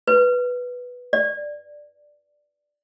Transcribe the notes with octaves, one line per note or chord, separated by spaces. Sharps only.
B4
D5